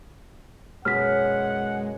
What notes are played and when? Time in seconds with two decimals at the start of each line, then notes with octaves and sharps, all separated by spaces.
0.85 F#2 B2 G#3 F#5 F6 B6